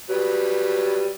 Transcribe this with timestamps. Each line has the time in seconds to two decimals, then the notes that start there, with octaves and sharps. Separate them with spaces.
0.10 F#3 G3 B4